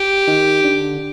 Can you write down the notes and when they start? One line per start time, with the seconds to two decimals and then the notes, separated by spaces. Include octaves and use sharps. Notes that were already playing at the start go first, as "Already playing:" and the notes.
Already playing: G4
0.27 D#3
0.64 D3